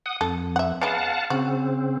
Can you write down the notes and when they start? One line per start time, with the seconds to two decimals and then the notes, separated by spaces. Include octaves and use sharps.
0.06 F#5 D#6
0.21 F2 A4
0.56 E5 F#5
0.82 G#3 B3 C#4 F5 F#5 A5
1.30 C#3 C4 F#4